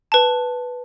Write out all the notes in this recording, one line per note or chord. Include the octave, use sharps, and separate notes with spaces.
B4 A5